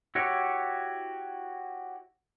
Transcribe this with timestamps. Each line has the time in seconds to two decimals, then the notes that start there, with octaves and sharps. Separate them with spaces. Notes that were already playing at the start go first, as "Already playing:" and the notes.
0.15 E4 F#4 G4 C#5